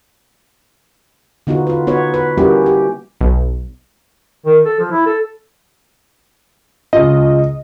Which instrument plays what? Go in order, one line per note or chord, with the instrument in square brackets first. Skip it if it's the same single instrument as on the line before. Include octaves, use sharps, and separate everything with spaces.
[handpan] D3 B3 D#4 F4 F#4
F4 B4
B3 D#4 F#4 B4 C#5
B4
G3 A#3 C#4 E4 F#4 G4
G4
[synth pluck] B1
[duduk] D#3
A4
F3
E4
A4
[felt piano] C#2 F4 [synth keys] D#5